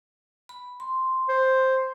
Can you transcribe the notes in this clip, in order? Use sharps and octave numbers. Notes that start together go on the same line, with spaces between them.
B5
C6
C5